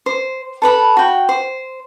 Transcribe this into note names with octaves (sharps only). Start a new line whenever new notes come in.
C5
A4 B4 B5
F#4 G5
C5